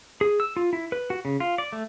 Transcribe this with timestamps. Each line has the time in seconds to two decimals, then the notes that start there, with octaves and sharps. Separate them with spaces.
0.21 G#4
0.40 E6
0.57 F4
0.73 E4
0.92 B4
1.10 F#4
1.25 C#3
1.40 F4
1.58 D5
1.72 A3